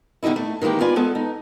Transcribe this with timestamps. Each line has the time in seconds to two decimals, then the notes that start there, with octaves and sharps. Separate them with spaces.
0.23 E2 D3 G3 D#4 E4
0.36 A3
0.62 D#3 E3 G#3 A#3 G4
0.81 F4 B4 D5 G#5
0.96 G#3 B3 A4
1.15 D#4